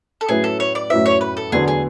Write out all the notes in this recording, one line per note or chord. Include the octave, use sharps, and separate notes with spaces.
A4
A2 F#3 C#4 E4 G#4 B4
A4
C#5
D5
A2 F#3 C#4 E4 B4 E5
C#5
B4
A4
E2 D3 F#3 B3 G#4
G#4